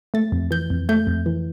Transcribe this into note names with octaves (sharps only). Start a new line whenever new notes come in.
A3 A6
F2
E3 G6
F2
A3 G6
F2
E3